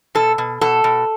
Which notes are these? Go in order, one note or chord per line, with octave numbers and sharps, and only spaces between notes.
B2 A4
B2
B2 A4
B2